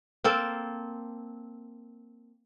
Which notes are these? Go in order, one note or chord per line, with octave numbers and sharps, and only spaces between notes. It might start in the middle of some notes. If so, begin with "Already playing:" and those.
A#3 C4 A4